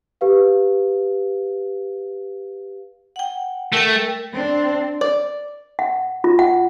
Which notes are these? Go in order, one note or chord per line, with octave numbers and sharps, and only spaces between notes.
G4 B4 F5
F#5 G5
A3 A#4 G5
C4 D4
D5
F#5
F4
F#5